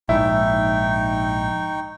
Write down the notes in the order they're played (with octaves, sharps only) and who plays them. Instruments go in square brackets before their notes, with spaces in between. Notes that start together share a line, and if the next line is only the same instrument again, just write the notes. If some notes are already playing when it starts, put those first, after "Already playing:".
[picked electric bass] A#1 G#2 [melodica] D#4 G5 C#6 [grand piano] E4